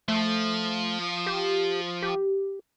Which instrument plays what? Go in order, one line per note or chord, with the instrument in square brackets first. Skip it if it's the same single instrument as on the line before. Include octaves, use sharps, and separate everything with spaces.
[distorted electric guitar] F3 [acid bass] A3
[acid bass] G4
G4